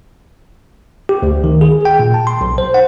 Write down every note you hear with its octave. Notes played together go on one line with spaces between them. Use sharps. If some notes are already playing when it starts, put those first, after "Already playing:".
G4
D2
D#3
G#4
G5
A#2
A5
C6
B1
C5
F#5